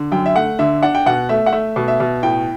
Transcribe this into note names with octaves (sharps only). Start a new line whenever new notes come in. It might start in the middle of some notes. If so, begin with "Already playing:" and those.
Already playing: D3
F#2 G5
E5
A3 F#5
D3 E5
D4 F#5
G5
B2 F#5
A3 E5
F#5
A3 E5
B2
E5
B2
A2 G5